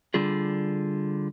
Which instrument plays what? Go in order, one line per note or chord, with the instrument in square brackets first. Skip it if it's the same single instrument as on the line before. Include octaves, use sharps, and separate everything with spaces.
[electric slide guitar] D3 G3 F4 G#4